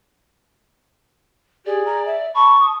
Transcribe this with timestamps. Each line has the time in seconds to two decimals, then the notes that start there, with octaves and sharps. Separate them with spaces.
1.66 G4 G#4 D5
1.85 A#5
2.06 E5
2.35 A5 B5 C#6
2.61 D#6